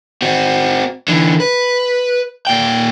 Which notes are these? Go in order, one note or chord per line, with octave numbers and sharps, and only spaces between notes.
C4 F#4
D3 E3
B4
A#2 G5